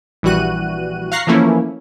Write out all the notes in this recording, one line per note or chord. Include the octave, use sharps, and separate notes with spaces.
A#1 E3 G3 F#4 F#6 D#7
F5 A#5 C#6 F#6 A#6 C7
E3 F3 A3 A#3 C#4 E4